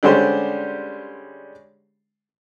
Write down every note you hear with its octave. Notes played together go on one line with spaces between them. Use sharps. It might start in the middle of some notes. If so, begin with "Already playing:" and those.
D3 G3 G#3 C#4 G4 C5